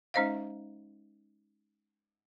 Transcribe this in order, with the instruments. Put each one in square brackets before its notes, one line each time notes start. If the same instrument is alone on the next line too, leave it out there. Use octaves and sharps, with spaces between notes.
[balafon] G#3 C#4 D#4 C5 D#5 F5